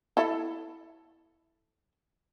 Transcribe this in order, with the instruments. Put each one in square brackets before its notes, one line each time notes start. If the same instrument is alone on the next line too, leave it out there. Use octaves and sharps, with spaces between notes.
[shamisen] E4 A4 E5